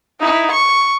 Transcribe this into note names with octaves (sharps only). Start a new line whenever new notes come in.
D#4 E4
C#6